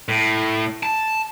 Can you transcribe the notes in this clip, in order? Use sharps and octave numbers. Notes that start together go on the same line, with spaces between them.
A2
A5